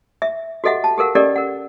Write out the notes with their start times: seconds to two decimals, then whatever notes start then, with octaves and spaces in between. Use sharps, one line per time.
0.22 E5
0.64 F#4 G4 A4 D#5 E5 F#5
0.84 A5
0.98 G4 A4 A#4 F5 F#5
1.15 C#4 G4 A4 A#4 D5 D#5
1.36 A#4 F#5